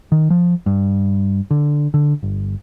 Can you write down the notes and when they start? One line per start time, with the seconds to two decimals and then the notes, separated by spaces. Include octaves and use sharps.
0.12 D#3
0.30 F3
0.66 G2
1.51 D3
1.94 D3
2.23 G1